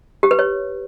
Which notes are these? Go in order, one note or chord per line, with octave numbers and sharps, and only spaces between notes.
G4
B4
C#5